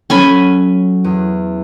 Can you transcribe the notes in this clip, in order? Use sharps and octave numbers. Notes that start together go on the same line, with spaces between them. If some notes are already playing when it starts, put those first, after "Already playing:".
F#3 C#4 A4 G#5 B5
E2